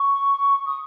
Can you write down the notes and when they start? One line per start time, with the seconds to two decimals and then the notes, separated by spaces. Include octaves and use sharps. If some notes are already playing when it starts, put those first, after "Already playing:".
Already playing: C#6
0.66 D#6